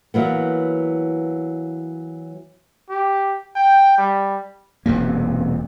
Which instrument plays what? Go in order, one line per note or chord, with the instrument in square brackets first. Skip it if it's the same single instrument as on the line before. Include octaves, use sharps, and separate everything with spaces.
[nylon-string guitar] E3 F#3 A#3 B3
[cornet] G4
G5
G3
[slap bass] E1 F#2 C3 A#3